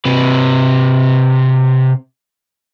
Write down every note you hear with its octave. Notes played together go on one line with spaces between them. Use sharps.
C3 B4